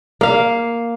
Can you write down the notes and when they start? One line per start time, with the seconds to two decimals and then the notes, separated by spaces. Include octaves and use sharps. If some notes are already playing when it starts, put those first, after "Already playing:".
0.21 A#3 F5